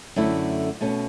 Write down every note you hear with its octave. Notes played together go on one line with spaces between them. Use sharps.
F#2 D3 A3 E4
B2 A3 C#4